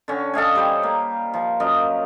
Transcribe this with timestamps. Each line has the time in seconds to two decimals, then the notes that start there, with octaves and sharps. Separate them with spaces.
0.08 D3 C#4
0.34 A4 D#5 F5 G#5
0.55 G3 C5
0.83 A#3
1.34 F3
1.60 F#2 D#5 F5